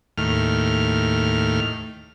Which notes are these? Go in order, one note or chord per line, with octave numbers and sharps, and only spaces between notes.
D#2 A2 F6